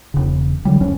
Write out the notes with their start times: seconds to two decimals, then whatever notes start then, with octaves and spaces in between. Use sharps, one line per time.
0.14 E1 C#3
0.65 D3 F#3 G3
0.80 D1 F#2 C#4